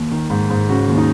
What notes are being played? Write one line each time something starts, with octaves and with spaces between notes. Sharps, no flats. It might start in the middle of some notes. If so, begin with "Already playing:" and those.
Already playing: D#2
D#3
G#2
G#2
C#3 F#4
D#2
D#4